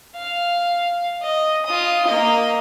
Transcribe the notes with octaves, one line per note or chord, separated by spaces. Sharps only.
F5
D#5
F4 D#6
A#3 D#5